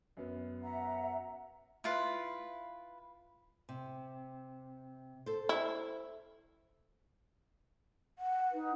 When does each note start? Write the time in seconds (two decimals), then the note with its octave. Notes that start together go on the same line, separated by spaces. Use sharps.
0.17 F#2 B3
0.63 E5 F#5 A#5
1.84 E4 F4 B4
3.69 C3
5.26 A4 C5
5.49 E4
8.19 F#5
8.51 D#4 B4